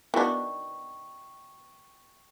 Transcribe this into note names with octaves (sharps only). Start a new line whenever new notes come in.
D#3 B3 D4 E4 F#4 G5 C#6